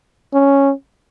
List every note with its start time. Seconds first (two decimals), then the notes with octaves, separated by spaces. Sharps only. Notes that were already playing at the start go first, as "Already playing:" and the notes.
0.34 C#4